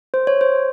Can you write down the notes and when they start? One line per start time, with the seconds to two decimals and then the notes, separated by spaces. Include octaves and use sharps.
0.14 C5
0.27 C#5
0.41 C5